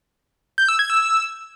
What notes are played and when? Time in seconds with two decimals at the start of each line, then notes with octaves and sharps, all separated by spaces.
0.58 G6
0.68 E6
0.79 G#6
0.90 E6